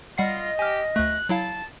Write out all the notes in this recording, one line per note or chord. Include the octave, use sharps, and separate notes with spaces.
G3 F4 D#5 F#5 C7
G4 G#5 F6
D2 A3 F#6
F#3 E4 F5 A5